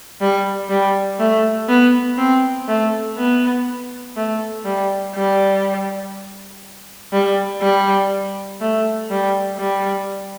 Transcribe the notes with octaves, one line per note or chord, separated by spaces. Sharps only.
G3
G3
A3
B3
C4
A3
B3
A3
G3
G3
G3
G3
A3
G3
G3